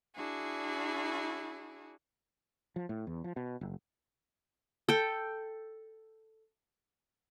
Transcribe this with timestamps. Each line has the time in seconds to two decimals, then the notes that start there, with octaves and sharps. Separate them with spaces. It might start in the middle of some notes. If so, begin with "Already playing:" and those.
0.14 D4 E4 F#4 G#4
2.76 F3
2.89 A2
3.07 E2
3.24 F3
3.36 B2
3.61 F#1
4.89 A4 G5